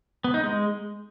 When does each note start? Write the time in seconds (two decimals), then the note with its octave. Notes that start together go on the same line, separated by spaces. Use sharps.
0.24 B3
0.34 D#4
0.44 G#3